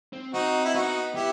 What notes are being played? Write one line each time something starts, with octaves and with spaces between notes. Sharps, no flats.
C4
C4 D#4 F#4
E4
B3 D#4 F#4
B3 E4 G4